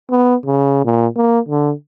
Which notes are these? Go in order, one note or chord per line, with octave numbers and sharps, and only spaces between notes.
B3
C#3
A#2
A#3
D3